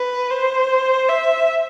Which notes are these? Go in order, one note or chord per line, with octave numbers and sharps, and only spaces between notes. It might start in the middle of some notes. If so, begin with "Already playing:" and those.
Already playing: B4
C5
E5